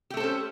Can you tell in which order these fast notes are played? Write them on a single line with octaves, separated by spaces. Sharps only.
G4 A3 A4 C5 C#4